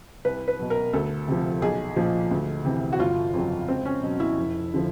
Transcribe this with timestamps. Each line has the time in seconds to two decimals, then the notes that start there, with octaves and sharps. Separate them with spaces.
0.25 C2 B4
0.48 B4
0.59 B2 F#3
0.70 A#4
0.93 D2 A4
1.28 C3 F3
1.62 B1 G#4
1.96 A#2 F3
2.31 D2
2.65 C3 E3
2.93 F#4
2.99 G1 F4
3.34 F2 C#3 F#3
3.68 C#2 C4
3.85 C#4
4.02 B2 F#3
4.20 E4
4.37 F1
4.74 D3 F3